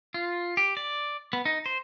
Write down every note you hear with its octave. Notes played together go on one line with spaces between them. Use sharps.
F4
G4
D5
B3
D#4
C5